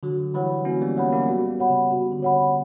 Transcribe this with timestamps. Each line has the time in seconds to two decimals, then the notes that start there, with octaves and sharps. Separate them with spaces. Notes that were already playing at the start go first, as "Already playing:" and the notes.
0.03 D3 F#3 F#4
0.34 E3 G3 C#5 F#5 B5
0.65 A#3 C#4 F#4
0.81 G3 B3
0.97 F#3 A#3 C#5 F#5 B5
1.12 A#3 C#4
1.24 A#3
1.28 G3 B3 F#4
1.59 C#5 F#5 B5
1.70 C#3
1.91 C#3 F#4
2.12 D3
2.22 C#5 F#5 B5
2.32 D3